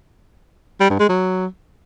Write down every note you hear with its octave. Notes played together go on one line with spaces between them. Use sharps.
G3
G2
G#3
F#3